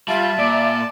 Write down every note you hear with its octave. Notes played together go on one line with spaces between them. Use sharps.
G3 F4 E5 A5
A#2 D5